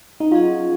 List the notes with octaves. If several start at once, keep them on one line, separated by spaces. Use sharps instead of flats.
D#4
F#3 C#4 F4 G#4 D#5 F#5